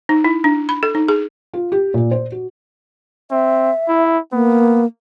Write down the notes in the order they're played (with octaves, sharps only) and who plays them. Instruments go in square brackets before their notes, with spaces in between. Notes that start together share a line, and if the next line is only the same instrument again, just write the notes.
[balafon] D#4
E4
D4
B5
A4
D#4
G#4
[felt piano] F4
G4
A#2
C5
F#4
[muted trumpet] C4 [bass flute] E5
[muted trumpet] E4
[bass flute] A#3 [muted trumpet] B3